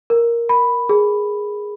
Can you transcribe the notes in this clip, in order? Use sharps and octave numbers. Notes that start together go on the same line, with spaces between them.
A#4
B5
G#4